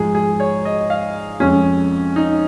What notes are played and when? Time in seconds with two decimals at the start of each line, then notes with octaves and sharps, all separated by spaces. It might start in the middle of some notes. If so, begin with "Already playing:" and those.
Already playing: G#2 F3 G#3 G#4
0.15 G#4
0.40 C#5
0.65 D#5
0.90 F5
1.40 F2 F3 G#3 C#4
2.16 D#4